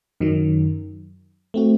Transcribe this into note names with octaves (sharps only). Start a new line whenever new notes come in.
F#2 D#3 F#3
A3 C4 F#4